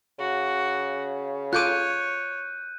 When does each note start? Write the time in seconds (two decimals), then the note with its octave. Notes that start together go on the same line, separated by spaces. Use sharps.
0.19 C#3 F#4
1.53 F4 A4 C#5 D6 F#6 G6 D#7